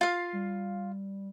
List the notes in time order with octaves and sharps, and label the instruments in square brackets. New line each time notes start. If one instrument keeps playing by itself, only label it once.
[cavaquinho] F4 F5
[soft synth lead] G3